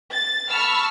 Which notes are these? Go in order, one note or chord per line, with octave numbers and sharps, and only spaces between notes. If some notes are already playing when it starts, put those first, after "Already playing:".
A6
A5 B5 C#6 E6 F6